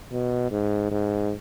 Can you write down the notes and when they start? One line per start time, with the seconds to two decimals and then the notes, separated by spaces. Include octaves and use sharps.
0.12 B2
0.51 G#2
0.91 G#2